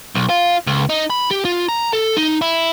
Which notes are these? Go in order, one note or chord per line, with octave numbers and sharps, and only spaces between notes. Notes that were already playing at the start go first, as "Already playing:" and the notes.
B1
F4
C#2
D#4
B5
G4
F4
A#5
A4
D#4
E4